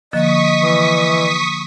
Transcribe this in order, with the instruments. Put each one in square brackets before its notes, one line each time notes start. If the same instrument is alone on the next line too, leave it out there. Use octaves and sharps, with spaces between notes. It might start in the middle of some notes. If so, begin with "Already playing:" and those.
[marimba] D3 F3 A#3 [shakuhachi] D#5 [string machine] C#6 D#6 B6
[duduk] E3